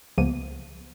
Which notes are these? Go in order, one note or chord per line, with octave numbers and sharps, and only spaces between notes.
C#2 C#3 F3 A#3 B3 D#7